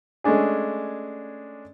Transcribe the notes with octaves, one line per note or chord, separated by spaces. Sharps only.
G#3 A3 C#4 D4 G#4